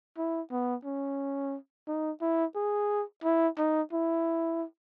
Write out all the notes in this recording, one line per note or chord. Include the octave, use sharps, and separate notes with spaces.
E4
B3
C#4
D#4
E4
G#4
E4
D#4
E4